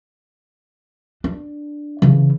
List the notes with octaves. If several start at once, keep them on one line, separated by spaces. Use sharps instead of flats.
D4
C#3 E3